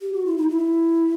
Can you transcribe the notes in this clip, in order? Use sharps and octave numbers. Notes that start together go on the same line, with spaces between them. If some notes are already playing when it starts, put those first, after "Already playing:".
G4
F#4
E4
D#4
E4